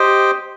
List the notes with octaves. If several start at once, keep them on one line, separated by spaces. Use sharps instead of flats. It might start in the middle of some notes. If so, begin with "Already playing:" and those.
Already playing: G4 C5 D#5 G5